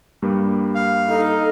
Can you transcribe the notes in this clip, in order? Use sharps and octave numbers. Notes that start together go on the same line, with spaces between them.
G2 G3 A#3
F5
D#4 A4